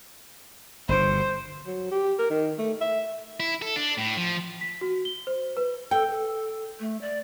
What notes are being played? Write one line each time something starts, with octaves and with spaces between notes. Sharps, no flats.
G1 B2 C5
F#3
G4
A#4
D#3
A3
E5
E4
A4
D4
A2
F3
B6
F#4
G7
C5
B4
A4 G5
A4
A3
D5